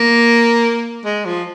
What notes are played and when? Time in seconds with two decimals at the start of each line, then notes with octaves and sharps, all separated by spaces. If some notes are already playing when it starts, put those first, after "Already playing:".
Already playing: A#3
1.05 G#3
1.25 F3